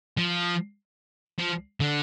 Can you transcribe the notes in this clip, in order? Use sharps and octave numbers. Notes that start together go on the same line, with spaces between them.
F3
F3
D3